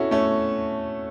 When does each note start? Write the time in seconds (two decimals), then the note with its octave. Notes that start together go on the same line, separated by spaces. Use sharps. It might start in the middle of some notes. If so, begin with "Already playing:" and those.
Already playing: C#4 E4 F#4 A4
0.11 A3 C#4